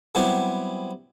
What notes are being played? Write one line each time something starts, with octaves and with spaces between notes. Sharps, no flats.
F#3 G3 B3 C4 E4 G4